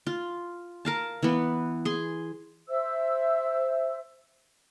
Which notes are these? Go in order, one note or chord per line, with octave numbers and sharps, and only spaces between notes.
F4
A#4 F5 A5
E3 B3
G#4 C6
C5 E5 E6